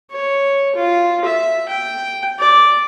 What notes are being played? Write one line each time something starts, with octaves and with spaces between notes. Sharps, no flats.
C#5
F4
E5
G5
D5